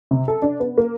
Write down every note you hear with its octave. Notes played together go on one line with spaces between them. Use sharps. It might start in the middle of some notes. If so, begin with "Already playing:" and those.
C3
A4
D4
B3
A#3